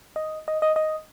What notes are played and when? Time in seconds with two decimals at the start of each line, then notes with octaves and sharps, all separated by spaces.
0.16 D#5
0.48 D#5
0.62 D#5
0.76 D#5